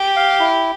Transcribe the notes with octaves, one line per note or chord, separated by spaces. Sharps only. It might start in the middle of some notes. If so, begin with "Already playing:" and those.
Already playing: G4
F5
E4